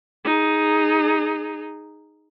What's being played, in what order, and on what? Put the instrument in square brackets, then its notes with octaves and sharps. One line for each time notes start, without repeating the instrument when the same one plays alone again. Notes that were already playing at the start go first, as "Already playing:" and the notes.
[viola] D#4 G#4